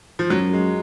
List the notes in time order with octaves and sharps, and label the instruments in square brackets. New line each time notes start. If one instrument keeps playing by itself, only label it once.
[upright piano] F3
[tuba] F#2 [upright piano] F#3
[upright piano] G#3